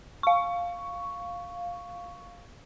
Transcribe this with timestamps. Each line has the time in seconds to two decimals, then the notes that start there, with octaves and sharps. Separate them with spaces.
0.23 F5 C#6